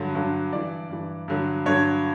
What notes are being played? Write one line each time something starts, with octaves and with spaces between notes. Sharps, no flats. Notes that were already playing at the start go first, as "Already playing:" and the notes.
Already playing: G2 D3 F#3
G2 D3 F#3
G2 E3 D5
G2 E3
G2 D3 F#3
G2 D3 F#3 C#5